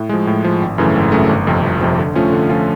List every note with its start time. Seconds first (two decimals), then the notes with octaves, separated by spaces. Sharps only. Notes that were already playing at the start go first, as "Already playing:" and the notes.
Already playing: A2
0.09 F3 G#3
0.27 A2
0.44 F3 G#3
0.62 G#1
0.78 F#2 C#3 E3 A3
0.96 G#1
1.12 F#2 C#3 E3 A3
1.29 G1
1.47 F2 C3 F3
1.64 G1
1.81 F2 C3 F3
1.98 D3
2.15 F3 A3 C#4 F4
2.32 D3
2.49 F3 A3 C#4 F4